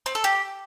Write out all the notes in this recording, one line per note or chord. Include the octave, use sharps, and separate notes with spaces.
C4
A4
G4